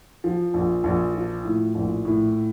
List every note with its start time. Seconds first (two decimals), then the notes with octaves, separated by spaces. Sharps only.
0.24 F3
0.54 A#1
0.84 A#1
1.15 F3
1.45 A2
1.75 A#1
2.05 A2